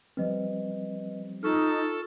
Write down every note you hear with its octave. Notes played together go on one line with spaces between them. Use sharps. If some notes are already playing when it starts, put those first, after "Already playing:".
F3 G3 C4 B4 D#5
D#4 F4 A4 C#6 F6